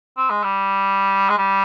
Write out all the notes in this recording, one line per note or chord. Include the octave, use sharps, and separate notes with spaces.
C4
G#3
G3
G#3
G3